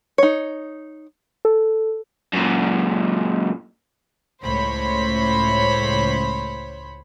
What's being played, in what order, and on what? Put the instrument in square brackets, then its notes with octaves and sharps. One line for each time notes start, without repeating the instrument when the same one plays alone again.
[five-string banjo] D#4 C#5
[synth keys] A4
[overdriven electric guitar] F#2 A#2
[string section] C#2 A2 C5 C#5 B5